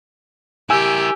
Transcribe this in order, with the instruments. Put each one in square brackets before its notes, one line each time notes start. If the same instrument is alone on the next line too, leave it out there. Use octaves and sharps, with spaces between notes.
[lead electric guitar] E4 A#4 [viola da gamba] G4 [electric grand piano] G#5 E6